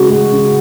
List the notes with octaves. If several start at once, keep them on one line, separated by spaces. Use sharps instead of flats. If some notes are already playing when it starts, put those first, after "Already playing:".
Already playing: C#3 G#3 F#4
G#3
C#3